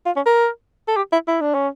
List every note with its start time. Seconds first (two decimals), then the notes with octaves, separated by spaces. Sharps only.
0.06 F4
0.16 C#4
0.26 A#4
0.88 A4
0.96 G4
1.12 E4
1.27 E4
1.41 D4
1.54 C#4